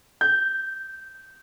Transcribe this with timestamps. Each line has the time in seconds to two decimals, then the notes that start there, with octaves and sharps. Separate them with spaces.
0.21 G6